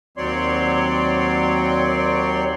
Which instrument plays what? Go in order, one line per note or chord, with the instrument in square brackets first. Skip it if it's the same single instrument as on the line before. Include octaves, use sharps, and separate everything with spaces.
[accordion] D#2 F#3 C4 C#5 D5 C6